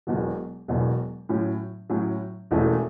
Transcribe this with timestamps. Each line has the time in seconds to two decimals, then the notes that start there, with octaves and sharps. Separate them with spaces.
0.07 E1 E2 B2 F#3
0.68 E1 E2 B2 F#3
1.29 A2 F#3 C#4
1.90 A2 F#3 C#4
2.51 E1 E2 E3 A3 C#4